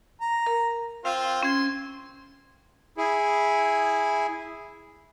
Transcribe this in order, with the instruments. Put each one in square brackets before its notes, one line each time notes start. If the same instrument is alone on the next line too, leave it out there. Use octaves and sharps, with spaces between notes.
[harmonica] A#5
[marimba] A#4
[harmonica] C4 F4 [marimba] F5
[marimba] C#4 G#6 [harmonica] C6
[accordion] E4 G#4